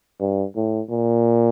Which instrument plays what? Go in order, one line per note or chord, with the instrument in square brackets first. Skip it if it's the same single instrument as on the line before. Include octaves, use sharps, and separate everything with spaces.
[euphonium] G2
A2
A#2